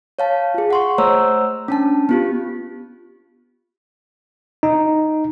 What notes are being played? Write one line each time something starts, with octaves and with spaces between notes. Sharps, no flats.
C#5 F5 A5
F4 G#4
F#5 C6 C#6
A3 C5 C#5 F#5 A#5 E6
C#4 D4 A5
B3 F4 G4
D#4